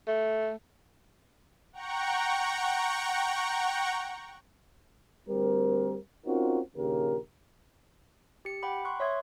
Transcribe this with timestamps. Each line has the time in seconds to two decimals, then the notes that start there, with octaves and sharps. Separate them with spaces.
0.08 A3
1.73 F#5 G5 A#5 C#6
5.29 D2 G3 C4 A#4
6.26 C4 C#4 D#4 F4 F#4 A#4
6.76 A#1 D#2 C#3 G4 A#4
8.45 G4 C#7
8.63 F#5 G5 B5 D6
8.85 C6 C#6 F#6
9.00 C#5 E5 C6 D#6 G#6